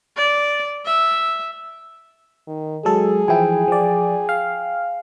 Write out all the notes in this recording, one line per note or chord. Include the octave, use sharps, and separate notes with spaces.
D5
E5
D#3
F#3 G#3 G#4 A4
E3 F3 E4 G5 G#5
F3 D5
F5